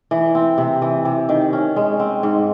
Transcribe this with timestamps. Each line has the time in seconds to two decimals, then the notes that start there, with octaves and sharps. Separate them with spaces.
0.11 E3
0.35 C4
0.58 C3
0.82 E3
1.05 C3
1.29 D#3
1.53 C#4
1.76 G#3
1.99 C4
2.23 G#2